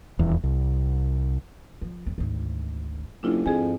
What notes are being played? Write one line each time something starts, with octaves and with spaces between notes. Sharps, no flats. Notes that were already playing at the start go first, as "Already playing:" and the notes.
D#1 E2
C2
F3
F2
G#1 D2
F#1 D4 E4 F4
F2 G#2 G#4 G#5